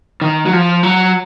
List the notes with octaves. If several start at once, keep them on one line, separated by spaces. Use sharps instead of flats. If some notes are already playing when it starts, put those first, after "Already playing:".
D#3
F#3
F3
F#3